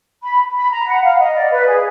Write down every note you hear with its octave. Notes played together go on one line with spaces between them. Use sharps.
B5
B5
A#5
F#5
F5
D#5
D5
B4
G#4